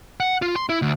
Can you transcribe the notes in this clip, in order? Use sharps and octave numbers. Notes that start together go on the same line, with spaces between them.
F#5
F4
C6
E4
D2